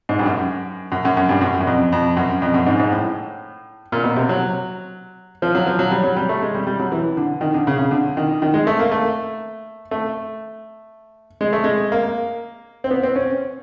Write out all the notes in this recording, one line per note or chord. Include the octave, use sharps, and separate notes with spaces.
G#2
G2
F#2
F#2
F#2
F#2
G2
F#2
F#2
F2
F2
F#2
F2
F#2
G#2
G#2
A2
A#2
B2
C3
F#3
F3
F#3
F3
F#3
G3
F#3
G3
A3
G#3
G3
G3
F#3
E3
D3
D#3
D3
C#3
C#3
D3
D#3
D#3
G#3
A3
A#3
A3
A3
G#3
A3
G#3
A#3
C4
B3
C4
C#4